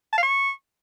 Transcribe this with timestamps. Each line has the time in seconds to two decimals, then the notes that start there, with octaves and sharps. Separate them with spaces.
0.13 A5
0.18 F5
0.23 C#6